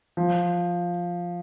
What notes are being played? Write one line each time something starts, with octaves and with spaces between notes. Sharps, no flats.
F3